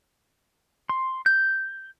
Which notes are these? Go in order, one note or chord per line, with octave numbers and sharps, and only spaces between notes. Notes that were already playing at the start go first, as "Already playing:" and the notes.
C6
G6